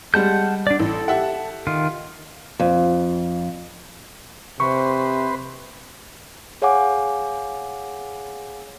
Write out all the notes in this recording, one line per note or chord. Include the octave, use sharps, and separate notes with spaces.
G3 G#3 F#5 A5 G6
D4 D5
A1 A4
G4 E5 F#5
D#3 F4
F2
C3 B4 C5 C#6
G#4 C#5 F5 F#5 G#5 D6